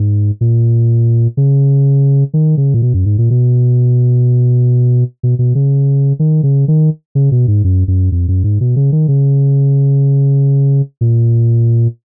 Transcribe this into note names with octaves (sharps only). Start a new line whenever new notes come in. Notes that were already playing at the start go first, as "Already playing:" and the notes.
Already playing: G#2
A#2
C#3
D#3
C#3
A#2
B2
F#2
G#2
A#2
B2
B2
B2
C#3
D#3
C#3
D#3
C#3
B2
G#2
F#2
F#2
F2
F#2
G#2
B2
C#3
D#3
C#3
A#2